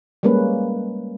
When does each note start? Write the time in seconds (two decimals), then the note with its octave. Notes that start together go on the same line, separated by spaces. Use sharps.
0.23 G3 G#3 A#3 C#4 B4